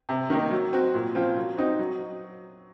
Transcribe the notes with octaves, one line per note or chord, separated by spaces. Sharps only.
C3
D#3 A#3 D#4
F#3
C4 F#4
A#2
F3 C4 F4
F#3
C4 D#4 F#4
F#3